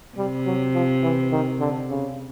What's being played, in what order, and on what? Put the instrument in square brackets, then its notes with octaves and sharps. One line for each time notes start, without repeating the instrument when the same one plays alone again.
[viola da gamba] C3 [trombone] G3
[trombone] F#3
F3
E3
D#3
D3
C#3